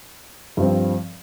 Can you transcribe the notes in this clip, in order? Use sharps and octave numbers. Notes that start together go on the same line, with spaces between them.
G2 F3 C4